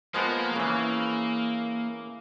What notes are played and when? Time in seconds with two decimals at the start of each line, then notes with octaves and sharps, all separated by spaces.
0.14 F3 G#3 A#3 B3
0.56 C#3 E3